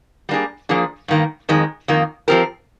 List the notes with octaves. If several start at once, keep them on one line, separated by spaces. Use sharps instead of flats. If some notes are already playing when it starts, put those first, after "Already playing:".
G3 A#3 D4 G#4
F3 A#3 D4 G#4
G2 D#3 A#3
F2 D#3 G#3
F2 D#3 A#3
F3 C4 G4 A#4